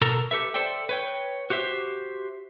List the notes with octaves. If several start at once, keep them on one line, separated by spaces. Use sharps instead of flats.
B2 A4 A#4 A#5
G4 A4 B4 E5
A4 C5 D5 E5 G5
B4 C#5 G5
F#4 G4 C5 E5